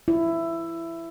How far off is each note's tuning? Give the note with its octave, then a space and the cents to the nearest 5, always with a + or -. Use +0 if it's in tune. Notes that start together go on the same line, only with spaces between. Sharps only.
E4 +15